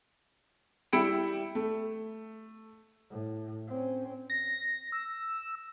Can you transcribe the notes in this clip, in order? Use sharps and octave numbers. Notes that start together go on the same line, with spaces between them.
G3 E4 G5 B5 C#7 D7
A3
A2
C4 C#4
A#6
E6